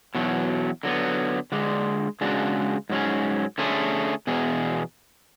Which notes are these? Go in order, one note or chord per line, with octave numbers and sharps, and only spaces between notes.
E2 B2 F#3
D3 F#3 B3
D3 G#3 D4
C#3 G#3 D4 F#4
G#2 F#3 C#4 G#4
D3 A3 C#4 G#4
E2 B2 G#4